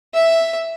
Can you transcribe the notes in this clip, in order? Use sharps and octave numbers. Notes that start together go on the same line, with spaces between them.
E5